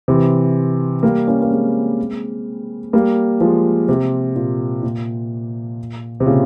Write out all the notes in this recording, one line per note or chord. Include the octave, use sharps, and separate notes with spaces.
C3 E3
G3 A#3
A#3 C#4
A#3
G#3 C4
G3 A#3
F3 G#3
C3
A#2
A#2
C3
A#2 C#3